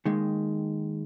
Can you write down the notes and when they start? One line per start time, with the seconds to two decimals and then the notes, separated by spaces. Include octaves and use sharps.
0.05 D#2 D#3 G#3